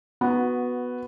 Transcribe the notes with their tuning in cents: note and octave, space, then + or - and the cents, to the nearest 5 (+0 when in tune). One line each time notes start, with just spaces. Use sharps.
B3 +0 F#4 -10